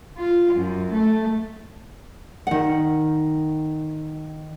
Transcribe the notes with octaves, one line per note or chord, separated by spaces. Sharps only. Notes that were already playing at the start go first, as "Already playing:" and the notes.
F4
F#2
A3
D#3 F#5